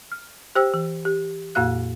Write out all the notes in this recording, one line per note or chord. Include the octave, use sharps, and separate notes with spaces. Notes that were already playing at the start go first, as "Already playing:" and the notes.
F6
G4 C5 G5 E6
E3
G4
F2 A#2 A#3 F#4 F5 F#6